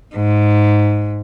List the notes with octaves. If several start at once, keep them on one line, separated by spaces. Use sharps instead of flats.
G#2